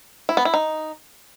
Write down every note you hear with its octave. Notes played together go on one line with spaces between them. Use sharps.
E4
B3
E4
D#4